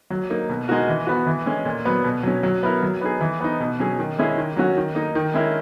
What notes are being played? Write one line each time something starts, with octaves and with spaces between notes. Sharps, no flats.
F#3
A#3 D#4
B2
G#3 D#4 F#4 A#4
E3
B3 F#4
E3
G#3 C#4
A#2
F#3 B3
B2
F#3 C#4
F#3
B3 E4 A#4
F#3
B3 D#4 G#4
E3
B3 D#4
B2
F#3 C#4 G#4
D#3
G#3 C#4 E4 G#4
D#3
F#3 C#4 F#4
D#3
A#3 D#4
D#3
G#3 C#4 E4 A#4